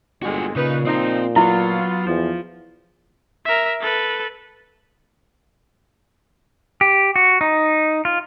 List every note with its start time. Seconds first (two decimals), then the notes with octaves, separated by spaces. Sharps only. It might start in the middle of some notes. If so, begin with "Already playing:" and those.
0.23 G1 A#2 D3 G#3 F#4 G#4
0.56 A#2 C#3 D#4 B4
0.85 F3 C4 D#4
1.36 F#3 B3 E4 F4
2.06 E2 F3
3.45 A#4 E5
3.81 A4 B4
6.81 G4
7.16 F#4
7.41 D#4
8.05 F4